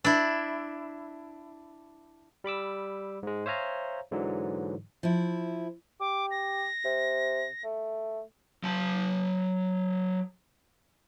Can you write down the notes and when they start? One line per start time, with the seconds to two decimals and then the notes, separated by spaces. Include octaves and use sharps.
0.04 D4 E4
2.44 G3 B5 D6 E6
3.23 G#2 G#3
3.46 C5 C#5 E5 F5 G#5 A#5
4.11 G#2 D3 E3 F#3
5.03 F3 E4
6.00 G4 D6
6.31 A#6
6.85 C3
7.64 A3
8.63 F#3 A5